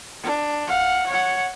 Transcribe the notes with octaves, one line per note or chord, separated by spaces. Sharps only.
D4
F5 F#5
C#5 F#5